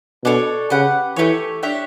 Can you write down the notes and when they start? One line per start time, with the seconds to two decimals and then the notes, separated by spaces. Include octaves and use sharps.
0.24 B2 D4 A4 C#5
0.70 C#3 G4 B4 F#5
1.16 E3 A3 C#4 G4 C#5
1.63 D4 G4 C#5 E5